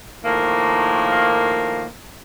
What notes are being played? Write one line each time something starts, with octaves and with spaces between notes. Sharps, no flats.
A2 D#3 F3 A#3